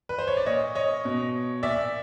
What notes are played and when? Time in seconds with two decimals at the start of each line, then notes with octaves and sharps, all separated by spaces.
0.09 B4
0.19 C5
0.28 C#5
0.37 D5
0.46 A#2 C#5 D#5
0.75 C#5 D#5
1.05 B2
1.63 A#2 D5 E5